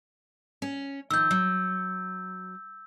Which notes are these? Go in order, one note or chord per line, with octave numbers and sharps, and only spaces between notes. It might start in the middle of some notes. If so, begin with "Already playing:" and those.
C#4
D#3 F3 E6 G6
F#3